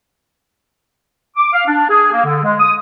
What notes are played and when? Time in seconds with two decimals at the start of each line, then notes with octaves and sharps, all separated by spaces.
1.36 D6
1.53 F5
1.67 D4
1.89 G#4
2.12 A#3
2.25 D3
2.43 G#3
2.59 D#6